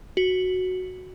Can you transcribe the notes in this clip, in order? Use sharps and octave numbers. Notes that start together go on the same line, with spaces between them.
F#4